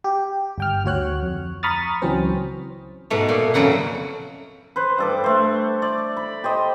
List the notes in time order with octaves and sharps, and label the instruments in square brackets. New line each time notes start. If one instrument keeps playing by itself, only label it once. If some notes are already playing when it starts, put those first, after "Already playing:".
[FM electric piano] G4
G1 G5 F6
D2 F#4 C#5 F#6
F2
A#5 B5 C#6 D#6 F6 A6
C#2 E3 F#3 C4 C#4 C5
[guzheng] G#2 B2 A3
A#2
F2 C#3 F#3 E4 F#5
[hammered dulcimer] B4 C5
G2 A4 D6
A3 C5
D5
B5
G4 C5 D#5